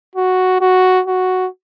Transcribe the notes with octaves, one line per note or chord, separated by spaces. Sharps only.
F#4
F#4
F#4